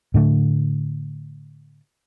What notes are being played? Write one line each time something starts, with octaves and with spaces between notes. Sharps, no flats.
A2 D3 A3